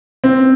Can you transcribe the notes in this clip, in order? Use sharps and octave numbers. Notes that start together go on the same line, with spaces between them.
C4